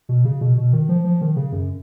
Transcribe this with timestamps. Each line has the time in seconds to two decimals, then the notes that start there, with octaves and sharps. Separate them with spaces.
0.09 B2
0.25 C#3
0.41 B2
0.58 B2
0.73 D#3
0.89 F3
1.04 F3
1.21 D#3
1.36 C#3
1.52 F#2